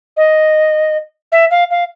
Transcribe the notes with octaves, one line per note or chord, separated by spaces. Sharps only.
D#5
E5
F5
F5